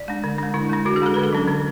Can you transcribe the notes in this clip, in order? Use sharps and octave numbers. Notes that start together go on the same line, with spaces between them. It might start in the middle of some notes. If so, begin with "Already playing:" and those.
Already playing: D5
G#3 D4
D3
G#3 D4
D3 E4
G#3 D4
D3 F#4
G#4
G#3 D4 A4
D3 B4
A4
F#3 C#4
D3